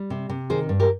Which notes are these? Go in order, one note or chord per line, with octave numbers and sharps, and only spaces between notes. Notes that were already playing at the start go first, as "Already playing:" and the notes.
Already playing: G3
C3
C3
D#3 G#4 C5
G2
G4 A#4